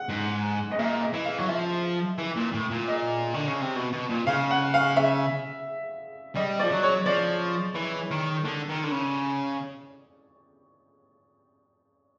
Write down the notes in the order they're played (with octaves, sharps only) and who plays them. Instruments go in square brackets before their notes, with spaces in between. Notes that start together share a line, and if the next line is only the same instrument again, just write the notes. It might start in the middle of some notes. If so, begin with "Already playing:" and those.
Already playing: [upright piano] F#5
[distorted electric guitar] G#2
[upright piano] D#5
[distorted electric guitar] A#2 [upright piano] E5
[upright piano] D#5
[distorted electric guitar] E3
[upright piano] F5
[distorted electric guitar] F#3
[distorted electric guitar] F3 [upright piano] E5
[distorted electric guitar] E3
A#2
A2
A#2
[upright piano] D#5
[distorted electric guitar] D3
C#3
C3
B2
B2
A#2
[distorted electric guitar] C#3 [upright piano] F5
[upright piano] F#5
F5
E5
[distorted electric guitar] G3 [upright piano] D#5
[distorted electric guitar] F3 [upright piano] D5
[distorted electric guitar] F#3
[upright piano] C#5
[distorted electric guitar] F3 [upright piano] D5
[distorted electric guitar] E3
D#3
D3
D#3
D3
C#3